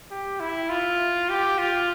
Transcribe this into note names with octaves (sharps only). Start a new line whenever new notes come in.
G4
E4
F4
G4
F4